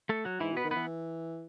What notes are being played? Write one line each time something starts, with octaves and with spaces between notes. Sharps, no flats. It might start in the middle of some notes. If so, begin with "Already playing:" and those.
A3 A4
F#3 F#4
G#2 E3 E4
B2
B3 B4
D#3
E3 B3 B4